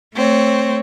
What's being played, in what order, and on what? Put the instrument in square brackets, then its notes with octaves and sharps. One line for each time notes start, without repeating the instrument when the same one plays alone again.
[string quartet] A3 C4 C#5